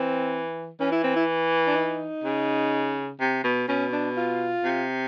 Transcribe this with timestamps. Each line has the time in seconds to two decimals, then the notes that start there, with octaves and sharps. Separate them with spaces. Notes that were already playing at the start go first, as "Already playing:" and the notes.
Already playing: E3 C4
0.80 E3 C#4
0.92 E4
1.04 C4
1.16 E4
1.67 D4
1.76 D#4
2.24 C#3
3.20 C3
3.44 B2
3.68 B2 C#4
3.93 D4
4.17 F4
4.64 C3